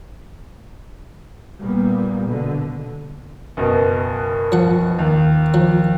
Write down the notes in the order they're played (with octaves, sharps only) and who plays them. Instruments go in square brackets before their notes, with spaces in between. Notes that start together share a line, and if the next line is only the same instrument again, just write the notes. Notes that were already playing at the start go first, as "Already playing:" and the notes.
[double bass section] A#2 G3 A#3 B3
B2 D3
[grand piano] F#1 B2
[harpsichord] F3 F#5
[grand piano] D#2
[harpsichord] F3